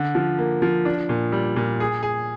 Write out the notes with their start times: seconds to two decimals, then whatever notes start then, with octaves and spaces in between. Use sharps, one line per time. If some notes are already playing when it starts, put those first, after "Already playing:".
Already playing: D3
0.15 F3
0.38 A#3
0.62 F3
0.85 D4
1.09 A#2
1.32 G3
1.56 A#2
1.80 G#4
2.03 G#4